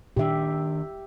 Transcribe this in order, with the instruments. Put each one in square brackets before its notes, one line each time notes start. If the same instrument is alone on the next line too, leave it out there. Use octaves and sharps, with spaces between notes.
[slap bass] A#2 D#3 D4 [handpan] G4 E5